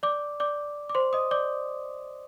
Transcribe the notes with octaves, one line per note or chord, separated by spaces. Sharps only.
D5 D6
D5 D6
D6
C5 C6
D#5 D#6
D5 D6